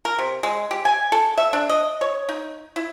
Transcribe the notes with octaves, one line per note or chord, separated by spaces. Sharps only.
A#4
C3
G#3
G4
G#5
A4
E5
D4
D#5
C#5
D#4
E4